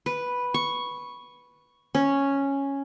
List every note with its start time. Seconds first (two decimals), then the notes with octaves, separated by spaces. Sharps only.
0.06 B4
0.54 C#6
1.95 C#4